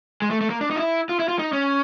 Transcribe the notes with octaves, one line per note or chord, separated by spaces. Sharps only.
G#3
A3
A3
A#3
D4
D#4
F4
E4
F4
E4
F4
D#4
C#4